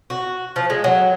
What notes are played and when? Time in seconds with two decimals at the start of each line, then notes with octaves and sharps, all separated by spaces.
0.10 F#4
0.56 F3
0.70 G#3
0.84 F#3